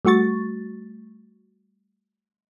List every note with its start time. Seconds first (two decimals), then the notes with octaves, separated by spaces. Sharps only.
0.05 G3 A3 F#4 C#6 A6